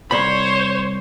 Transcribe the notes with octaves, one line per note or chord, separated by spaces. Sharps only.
C2 C5 C#5 B5